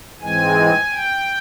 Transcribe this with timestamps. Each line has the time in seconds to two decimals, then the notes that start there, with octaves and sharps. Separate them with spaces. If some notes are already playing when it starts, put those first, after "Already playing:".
0.21 G#2 E3 G#3 C4 G#5
0.90 G5